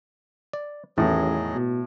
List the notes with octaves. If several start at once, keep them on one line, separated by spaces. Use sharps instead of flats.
D5
A1 E2 A2 D#3 F#3 G#4 D#5
B2